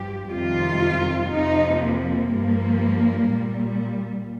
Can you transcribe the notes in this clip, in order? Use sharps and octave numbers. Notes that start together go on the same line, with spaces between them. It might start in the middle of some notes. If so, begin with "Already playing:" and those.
Already playing: G2 F3 G4
F2 C3 D#3 G3 F4
F2 C3 F3 D#4
A#3
G2 F3
A#2 G3